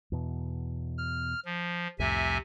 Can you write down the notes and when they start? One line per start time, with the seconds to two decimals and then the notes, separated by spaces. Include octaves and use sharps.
0.12 E2 B2
0.98 F6
1.45 F3
1.99 C2 F2 A2 C3 E5 G#5